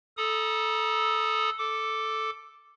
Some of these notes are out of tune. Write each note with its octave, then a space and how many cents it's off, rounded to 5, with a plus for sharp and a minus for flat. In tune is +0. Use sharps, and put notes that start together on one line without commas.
A4 -5 A#5 +40 D#6 +0
A4 +0 D6 +0